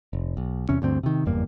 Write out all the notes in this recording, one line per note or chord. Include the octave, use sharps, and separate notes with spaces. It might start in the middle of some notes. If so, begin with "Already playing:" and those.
F1
B1
E2 C3 C#4
D2 G2 D3 C4
C3 D#3
F#1 E2 G2 A#3